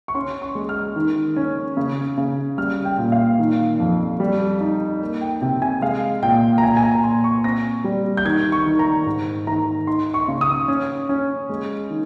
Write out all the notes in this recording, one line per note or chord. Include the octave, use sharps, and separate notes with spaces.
C#6
C#4 C6
C#6
G#3
F6
D#3
C#4
C#3
C#3
G3 F6
G5
A#2
F5
D#3
F2
G3
D#4
A#3
G5
C3 G5
G#5
G#3 F5
A#2 G5
A#5
A#2 G#5
G#5
A#5
A#2 C6
C#6
C4 A#6
G3
G6
D#3 G#6
C#6
D#3
A#5
G#2
D#3 A#5
D#4 C6
C#6
C#3
D#6
C#4
C#4
G#3
D#3